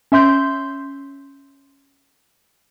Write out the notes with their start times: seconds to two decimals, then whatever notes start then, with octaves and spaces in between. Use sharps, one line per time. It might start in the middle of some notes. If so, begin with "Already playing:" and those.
0.12 C#4 E5 C6 G6